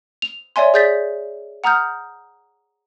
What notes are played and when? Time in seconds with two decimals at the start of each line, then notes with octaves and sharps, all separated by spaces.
0.22 F7
0.56 C#5 D5 E5 G#5 C6
0.74 G#4 D5 G6 A6 B6
1.64 F#5 A#5 D#6 F6 G6